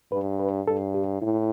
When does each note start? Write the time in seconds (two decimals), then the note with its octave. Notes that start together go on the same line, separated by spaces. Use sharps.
0.12 G2 B4
0.39 B4
0.68 G2 A4
0.94 G4
1.22 A2 E4